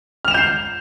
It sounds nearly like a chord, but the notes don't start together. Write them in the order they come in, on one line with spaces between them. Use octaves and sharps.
F6 F7 E7 G6 C7